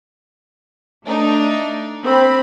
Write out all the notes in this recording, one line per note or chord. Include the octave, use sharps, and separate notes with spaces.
A3 D4 D#4
C4 B5